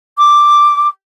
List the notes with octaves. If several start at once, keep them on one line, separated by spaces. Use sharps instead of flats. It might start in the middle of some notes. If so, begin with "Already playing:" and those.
D6